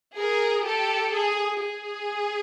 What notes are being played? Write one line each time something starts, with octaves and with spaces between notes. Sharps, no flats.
G#4 A#4
G4 A4
G#4
G#4